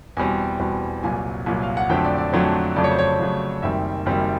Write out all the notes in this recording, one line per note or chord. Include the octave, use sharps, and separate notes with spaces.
E2 B2 G3 C4 G#5
E2 B2 G3 C4
C2 A#2 F#3 G#5
C2 A#2 F#3
F5
F#5
F2 D3 F#3 A3 C4 G5
D5
D5
F2 D3 F#3 A3 C4
F2 C#3 F#3 A3 D5
C#5
C5
C#5
F2 C#3 F#3 A3
F#1 F#2 D#3 G3 C4 E5
F#1 F#2 D#3 G3 C4